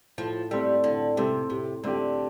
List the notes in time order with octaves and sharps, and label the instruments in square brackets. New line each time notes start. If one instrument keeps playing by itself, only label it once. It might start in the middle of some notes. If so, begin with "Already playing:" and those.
[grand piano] A2 [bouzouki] F3
[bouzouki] G3 [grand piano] A3 C4 A4
[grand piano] A2 [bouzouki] D3
[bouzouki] C3 [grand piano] A3 C4 A4
[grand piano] A2 [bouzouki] C3
[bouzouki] D3 [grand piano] A3 C4 G4